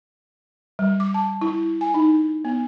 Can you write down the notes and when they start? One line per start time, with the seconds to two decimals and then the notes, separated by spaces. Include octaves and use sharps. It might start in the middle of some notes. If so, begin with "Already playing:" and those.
0.79 G3
1.00 D6
1.14 A5
1.42 E4
1.81 G#5
1.94 D#4
2.45 B3